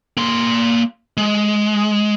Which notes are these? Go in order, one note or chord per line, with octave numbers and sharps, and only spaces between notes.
A#3 C6
G#3